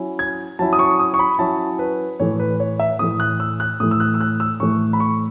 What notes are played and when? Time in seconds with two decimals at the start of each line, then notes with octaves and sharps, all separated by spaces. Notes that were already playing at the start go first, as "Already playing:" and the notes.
Already playing: F#3 C#4 E4
0.19 G#6
0.59 F#3 C#4 E4 A5
0.73 D#6
0.79 C#6
1.00 D#6
1.14 C#6
1.19 B5
1.39 F#3 C#4 E4 A5
1.79 B4
2.20 A2 E3 A3 C#5
2.40 B4
2.60 C#5
2.80 E5
2.99 A2 E3 A3 D#6
3.20 F#6
3.40 E6
3.60 F#6
3.80 A2 E3 A3 D#6
3.91 E6
4.00 F#6
4.14 E6
4.21 F#6
4.40 E6
4.60 A2 E3 A3 C#6
4.93 B5
5.00 C#6